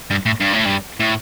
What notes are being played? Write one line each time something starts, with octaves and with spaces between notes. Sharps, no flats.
G2
A2
G2
A2
G2
A2